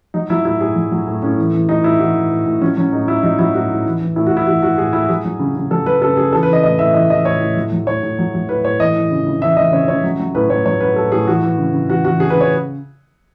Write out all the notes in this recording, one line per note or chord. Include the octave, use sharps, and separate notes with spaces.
F#3 D#4
F#3 E4
A2 E4
A2 G#4
F#3
F#3
A2
A2 C#4
E3
E3
A2 D#4
A2 E4
E3 F#4
E3
A2
A2
F#3 C#4
F#3 C#4
A2 D#4
A2 E4
F#3 D#4
F#3 E4
A2 F#4
A2
E3
E3
A2 E4
F#4
A2
E4
E3 F#4
E3 F#4
A2 G#4
A2 E4
F#3 G#4
F#3
C#3
C#3
F#3 A4
F#3 B4
C#3 A4
C#3 G#4
E3 A4
B4
E3 D#5
A2 D#5
A2 E5
E3 D#5
E3 D#5
A2 C#5
A2
F#3
F#3
A2 C#5
A2
F#3
F#3
A2 B4
A2 C#5
E3 D#5
E3
C#3
C#3
E3 E5
E3 D#5
C#3 C#5
C#3 C#5
F#3
F#3
A2 B4
A2 C#5
F#3 C#5
F#3 B4
A2 A4
A2 G#4
E3 F#4
E3
C#3
C#3
E3 F#4
E3 F#4
C#3 G#4
B4
C#3 C#5